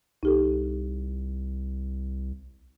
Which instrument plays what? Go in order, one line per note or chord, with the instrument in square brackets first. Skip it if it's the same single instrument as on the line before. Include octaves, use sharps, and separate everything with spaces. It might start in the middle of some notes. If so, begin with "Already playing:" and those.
[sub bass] C2 [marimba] D#4 G4 A4